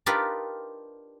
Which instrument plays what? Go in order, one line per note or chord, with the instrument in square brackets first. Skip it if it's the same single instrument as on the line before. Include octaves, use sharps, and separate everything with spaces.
[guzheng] D4 D#4 F4 G4 A#4 B4